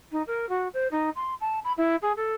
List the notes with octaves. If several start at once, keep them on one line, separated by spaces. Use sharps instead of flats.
D#4
A#4
F#4
C5
D#4
C6
A5
B5
E4
G#4
A4